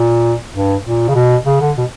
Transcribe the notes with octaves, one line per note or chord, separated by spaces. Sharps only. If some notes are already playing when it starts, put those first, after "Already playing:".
Already playing: A#2
G2
A#2
C#3
B2
C#3
D3
B2